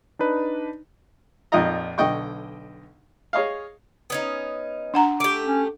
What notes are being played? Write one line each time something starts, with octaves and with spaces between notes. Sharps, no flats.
D4 D#4 B4
A#1 F2 D#4 F4 D#5 A#5
B1 D3 D#5 G5 C#6
G#4 C#5 D#5 F5
B3 C#4 D#4
D4 F#5 A#5
A3 G4 D6
C#4